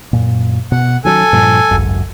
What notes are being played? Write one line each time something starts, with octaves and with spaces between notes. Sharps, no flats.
F#2 A#2
B2 F#5
D#3 F#3 C#4 A4 G#5
G2 A#2 F3
G#1 C#2 F#2